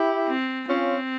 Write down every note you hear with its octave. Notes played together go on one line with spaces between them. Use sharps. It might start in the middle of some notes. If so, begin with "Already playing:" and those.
Already playing: E4 G4
C4
C4 C#4 F4